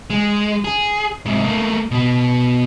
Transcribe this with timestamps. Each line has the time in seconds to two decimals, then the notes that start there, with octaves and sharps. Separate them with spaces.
0.10 G#3
0.64 G#4
1.26 G#2 C3
1.44 A3 A#3
1.91 B2 B3